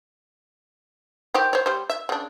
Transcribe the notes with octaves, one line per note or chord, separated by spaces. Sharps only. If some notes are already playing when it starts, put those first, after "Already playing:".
D#3 C4 G4
C5 C#5
G3 C5
E5
C#3 D4